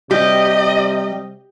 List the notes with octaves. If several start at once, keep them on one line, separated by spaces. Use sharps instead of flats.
C3 G3 G4 D#5